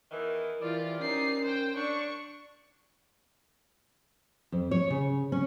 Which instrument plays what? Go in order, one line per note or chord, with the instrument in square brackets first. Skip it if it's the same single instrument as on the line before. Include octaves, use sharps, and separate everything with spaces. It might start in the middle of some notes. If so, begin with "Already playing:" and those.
[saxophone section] E2 D#3 E3 [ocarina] A#4
[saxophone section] C3 D5 [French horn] E3 [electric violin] F4
[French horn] C#4 [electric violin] D#4 C7 [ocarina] A#4
[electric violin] C5 G5
[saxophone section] D4 [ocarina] D5 [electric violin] C#6
[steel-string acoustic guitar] F2
C#5
C#3
C#4